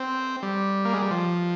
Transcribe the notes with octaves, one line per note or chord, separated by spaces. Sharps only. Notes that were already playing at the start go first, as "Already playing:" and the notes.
Already playing: C4
G3
A#3
G#3
G3
F3